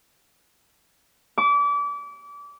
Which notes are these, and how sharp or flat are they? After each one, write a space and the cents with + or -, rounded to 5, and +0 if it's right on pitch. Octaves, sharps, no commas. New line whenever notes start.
D6 -30